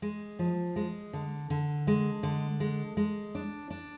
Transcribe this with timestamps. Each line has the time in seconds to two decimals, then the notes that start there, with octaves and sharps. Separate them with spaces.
0.02 G#3
0.39 F3
0.76 G#3
1.13 D3
1.50 D3
1.87 G#3
2.23 D3
2.60 G#3
2.97 G#3
3.35 D4
3.70 D4